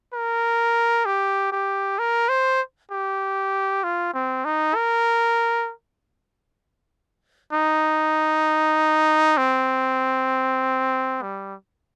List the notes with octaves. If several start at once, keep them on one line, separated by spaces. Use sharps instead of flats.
A#4
G4
G4
A#4
C5
G4
F4
C4
D#4
A#4
D#4
C4
G3